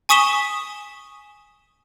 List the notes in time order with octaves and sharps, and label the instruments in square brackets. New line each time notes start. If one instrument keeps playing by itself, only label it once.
[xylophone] G#5 C#6 D#6 B6 E7 G7